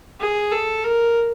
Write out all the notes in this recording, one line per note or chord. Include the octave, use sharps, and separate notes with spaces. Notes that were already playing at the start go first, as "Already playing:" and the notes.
G#4
A4
A#4